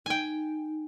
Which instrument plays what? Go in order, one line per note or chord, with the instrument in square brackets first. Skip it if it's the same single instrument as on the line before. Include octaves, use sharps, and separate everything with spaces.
[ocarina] D#4 [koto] G5 G#5